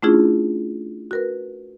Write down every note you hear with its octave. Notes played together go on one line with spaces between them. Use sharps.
A3 C#4 D4 E4 F4 G#4
F#4 A#4 B4